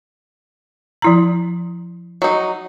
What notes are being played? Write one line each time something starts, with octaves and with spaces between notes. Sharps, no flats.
F3 E4 A#5
F#3 D#4